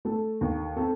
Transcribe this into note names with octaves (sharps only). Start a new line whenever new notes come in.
A3 A4
D#2
C4 A4